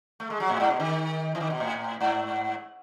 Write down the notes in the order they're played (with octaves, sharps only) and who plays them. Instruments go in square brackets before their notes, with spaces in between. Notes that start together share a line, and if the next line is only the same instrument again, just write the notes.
[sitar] A3
G#3
F#3
A2
G#2
B2
D#3
E3
D#3
B2
A2
G#2